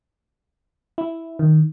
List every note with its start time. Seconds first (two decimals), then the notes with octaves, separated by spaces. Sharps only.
0.98 E4
1.39 D#3